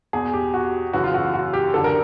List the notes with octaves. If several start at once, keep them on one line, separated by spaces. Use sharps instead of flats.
E2 B2 G#4
G4
F#4
F#2 C#3 E3 F#4
F4
F#4
F#4
G4
F#2 D3 A4
A#4